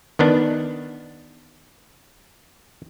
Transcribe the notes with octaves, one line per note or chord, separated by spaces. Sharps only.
D#3 B3 D4